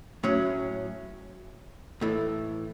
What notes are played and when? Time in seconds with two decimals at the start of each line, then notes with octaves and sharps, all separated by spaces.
0.24 A2 F#3 C#4
2.01 A2 E3 A3 E4